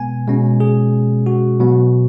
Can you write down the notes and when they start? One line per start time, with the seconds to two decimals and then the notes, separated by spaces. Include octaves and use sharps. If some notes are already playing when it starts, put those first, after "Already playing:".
Already playing: B2 G#3 B3 G#5
0.28 B2 G#3 C#4
0.60 G#4
1.26 F#4
1.60 B2 F#3 B3